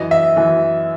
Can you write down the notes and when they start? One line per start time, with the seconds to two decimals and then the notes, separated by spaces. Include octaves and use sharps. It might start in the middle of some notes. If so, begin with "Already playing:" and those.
Already playing: F#2 E3 D#5
0.11 E5
0.36 F#2 E3